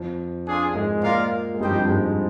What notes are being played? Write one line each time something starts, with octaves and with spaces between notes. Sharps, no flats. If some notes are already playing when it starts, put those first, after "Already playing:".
Already playing: F2 F3
D4 F4 G#4
G#2 G#3
A#2 A#3 F4 A#4 D5 F5
G#3
G2 G3 D#4 G4 C5 D#5 G5
F2 F3
G2 G3
G#2 G#3